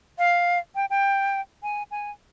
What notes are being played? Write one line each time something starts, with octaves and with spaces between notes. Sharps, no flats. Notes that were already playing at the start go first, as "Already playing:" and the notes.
F5
G5
G5
G#5
G#5